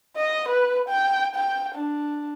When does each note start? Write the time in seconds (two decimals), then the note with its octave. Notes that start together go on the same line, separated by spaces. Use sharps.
0.16 D#5
0.48 B4
0.89 G5
1.35 G5
1.75 D4